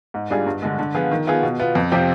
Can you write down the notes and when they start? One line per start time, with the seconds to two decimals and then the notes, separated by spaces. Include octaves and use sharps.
0.14 G#2
0.30 G3 D4 F4 G#4
0.46 G2
0.62 D3 G#3
0.79 D3
0.95 F3 B3 F4 G#4
1.11 D#3
1.27 B3 F4 G#4
1.43 B2
1.60 B3 F4
1.75 F2
1.92 C3 F3 C4 G4